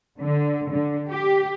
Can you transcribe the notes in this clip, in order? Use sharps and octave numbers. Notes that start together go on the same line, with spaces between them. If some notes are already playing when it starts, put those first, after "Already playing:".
D3
D3
G4